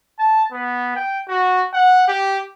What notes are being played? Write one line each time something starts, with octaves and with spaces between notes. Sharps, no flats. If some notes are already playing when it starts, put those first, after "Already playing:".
A5
B3
G5
F#4
F#5
G4